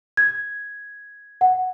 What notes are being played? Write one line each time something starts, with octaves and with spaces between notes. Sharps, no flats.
G#6
F#5